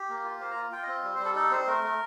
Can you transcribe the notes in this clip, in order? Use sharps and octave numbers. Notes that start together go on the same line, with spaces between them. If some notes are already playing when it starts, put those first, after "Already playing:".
Already playing: G4
A#3
F4
A#3 C5
A#5
F4
F4 G5
C4 D#5
G3
G3 C5
A4
D#4 A4
C4 C5
A3 A#4
A3